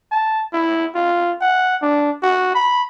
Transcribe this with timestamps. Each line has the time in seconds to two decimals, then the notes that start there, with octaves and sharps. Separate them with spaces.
0.11 A5
0.53 E4
0.95 F4
1.41 F#5
1.82 D4
2.23 F#4
2.55 B5